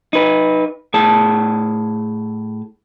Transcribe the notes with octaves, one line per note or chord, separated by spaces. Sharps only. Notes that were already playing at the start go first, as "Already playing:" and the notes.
D#4 B4
A2 G#4 A5